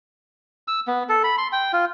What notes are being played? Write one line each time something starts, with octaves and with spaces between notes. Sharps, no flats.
E6
B3
A4
B5
C6
G5
F4